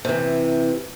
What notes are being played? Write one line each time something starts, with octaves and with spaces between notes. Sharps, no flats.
C3 E3